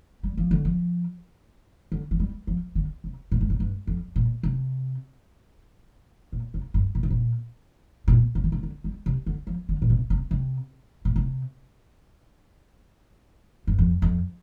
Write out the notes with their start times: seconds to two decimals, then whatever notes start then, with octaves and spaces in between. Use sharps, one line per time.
0.23 G3
0.37 F3
0.51 D3
0.65 F3
1.92 D3
2.11 F3
2.20 G3
2.47 F3
2.75 D3
3.04 C3
3.32 A#2
3.41 G2
3.50 A#2
3.60 G2
3.87 F2
4.16 A#2
4.43 C3
6.32 A#2
6.54 C3
6.74 G2
6.95 A#2
7.03 C3
7.10 A#2
8.08 A#2
8.35 C3
8.44 D3
8.52 C3
8.63 D3
8.84 G3
9.06 C3
9.26 D3
9.47 F3
9.69 D3
9.82 A#2
9.90 C3
10.10 C3
10.31 C3
11.05 A#2
11.16 C3
13.67 G2
13.78 F2
14.02 F2